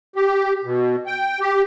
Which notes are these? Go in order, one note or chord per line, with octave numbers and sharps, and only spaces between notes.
G4
B2
G5
G4